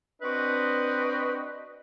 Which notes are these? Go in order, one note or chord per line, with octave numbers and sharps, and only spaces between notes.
C4 D4 F#4 B4 D#5